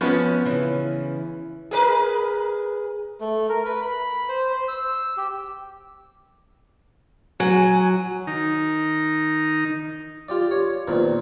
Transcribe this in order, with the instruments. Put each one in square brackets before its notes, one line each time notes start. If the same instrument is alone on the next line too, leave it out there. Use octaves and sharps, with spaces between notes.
[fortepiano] F3 B3 C#4 [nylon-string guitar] C#5
[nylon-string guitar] C#3 E3
[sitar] G#4 A#4 B4
[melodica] A3
A#4
B4
B5
C5
C5
E6
G4
[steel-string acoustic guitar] F#3 [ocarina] G#5
[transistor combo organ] D#3 D#4
[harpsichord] F4 G4 D5
C#5
E2 A#2 D#3 C4